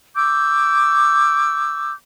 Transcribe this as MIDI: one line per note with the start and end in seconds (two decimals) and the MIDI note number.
0.16 1.92 85
0.16 1.92 86
0.16 1.92 88
0.16 1.92 91